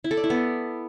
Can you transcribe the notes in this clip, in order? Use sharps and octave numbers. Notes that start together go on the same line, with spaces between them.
E4
A4
D5
E4
B3